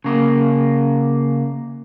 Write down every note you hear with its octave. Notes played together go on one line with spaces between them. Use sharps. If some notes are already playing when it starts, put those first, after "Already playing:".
C#3 A#3